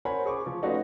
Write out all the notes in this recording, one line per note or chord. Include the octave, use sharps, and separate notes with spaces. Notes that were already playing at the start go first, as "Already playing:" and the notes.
A#4 C5 C#5 F#5 G#5 B5
G#4 C#6 D6
F3
A3 C#4 D#4 F4 F#4 B4